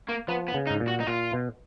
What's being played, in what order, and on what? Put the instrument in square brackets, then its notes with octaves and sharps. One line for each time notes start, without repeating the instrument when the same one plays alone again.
[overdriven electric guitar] A#3
[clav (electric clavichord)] F3 [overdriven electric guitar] B3
[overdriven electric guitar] B3
[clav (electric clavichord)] C#3
[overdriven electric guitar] D#4
[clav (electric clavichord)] G#2
A#2
[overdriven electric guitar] F#4
D#4
[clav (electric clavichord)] A#2 [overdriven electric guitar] F4
[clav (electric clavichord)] B2